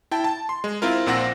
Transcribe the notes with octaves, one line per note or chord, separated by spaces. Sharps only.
E4 G5 A5
A5
C6
G#3
C4 E4 F4 A#4
A#1 A#2 C4 F#5 E6 A#6